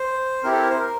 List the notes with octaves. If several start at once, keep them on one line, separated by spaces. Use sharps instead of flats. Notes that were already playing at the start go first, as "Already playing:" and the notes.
Already playing: C5
C4 E4 G4 A#4
A4
A#4
C5
A#4